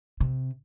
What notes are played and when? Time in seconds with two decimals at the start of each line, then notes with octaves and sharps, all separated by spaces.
0.20 C3